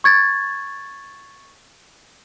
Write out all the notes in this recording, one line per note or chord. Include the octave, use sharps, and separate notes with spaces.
C#6 G#6 A6